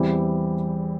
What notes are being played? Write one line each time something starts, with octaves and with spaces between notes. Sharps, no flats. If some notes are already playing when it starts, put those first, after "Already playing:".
Already playing: E2 E3 G3 C4